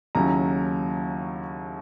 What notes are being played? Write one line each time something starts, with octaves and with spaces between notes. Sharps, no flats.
D#2 C#3 F#3 C#4 E4 A#5